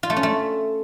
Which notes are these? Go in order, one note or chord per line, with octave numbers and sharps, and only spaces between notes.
F4
A3
C#4
A3